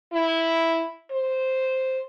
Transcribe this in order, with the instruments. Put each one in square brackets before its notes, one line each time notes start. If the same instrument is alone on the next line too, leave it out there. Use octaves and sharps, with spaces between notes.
[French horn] E4
C5